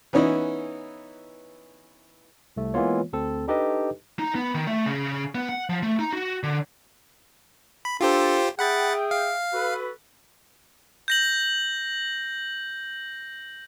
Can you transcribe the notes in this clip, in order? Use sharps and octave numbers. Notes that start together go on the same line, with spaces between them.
E3 B3 C#4 D#4 E4
C2 A3
E3 G#3 A#3 B3 F4 C#5
D2 C4 A4
D4 D#4 G4 A4 B4 D#5
D#4
B3
D#3
A3
C#3
B3
F#5
F3
A3
D#4
F#4
D3
B5
D4 F4 G4 A4 C5
G#4 E5 F#5 G5 B5 A6
F5
F#4 A4 B4
G6 A#6 F#7